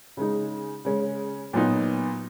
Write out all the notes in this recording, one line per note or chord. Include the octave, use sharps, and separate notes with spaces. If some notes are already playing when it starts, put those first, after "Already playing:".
C#3 G#3 D#4
C#3 G#3 C#4
A#2 F#3 B3 D#4